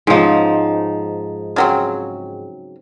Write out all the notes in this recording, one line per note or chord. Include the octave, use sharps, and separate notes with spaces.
G#2 F3 C#4 D#4
C#3 F#3 C4